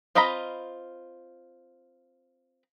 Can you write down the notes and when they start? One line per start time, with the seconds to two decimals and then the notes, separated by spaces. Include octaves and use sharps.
0.15 C4 F4 D#5 A#5 B5